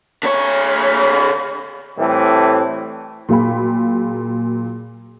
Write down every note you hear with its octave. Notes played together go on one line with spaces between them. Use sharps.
D3 C#5
A2 E3 G3 A3 C4
A#2 F#3 G#4 F5 G5 B5